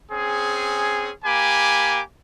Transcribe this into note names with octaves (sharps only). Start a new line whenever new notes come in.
C4 C#4 G#4
A#3 G4 G#5 B5 D6